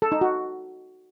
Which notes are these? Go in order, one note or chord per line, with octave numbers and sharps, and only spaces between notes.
A4
D#4
F#4